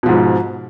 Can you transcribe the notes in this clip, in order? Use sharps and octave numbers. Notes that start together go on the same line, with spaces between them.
G#2 B2 F3